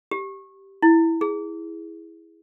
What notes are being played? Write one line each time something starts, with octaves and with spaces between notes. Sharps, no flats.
G4
E4
G#4